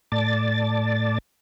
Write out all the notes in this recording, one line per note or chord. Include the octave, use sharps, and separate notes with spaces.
A2 D5 A5 A6